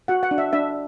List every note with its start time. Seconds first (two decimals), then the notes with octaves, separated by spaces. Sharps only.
0.08 F#4 F#5
0.23 F#5
0.31 D4
0.38 E5
0.53 D4 E5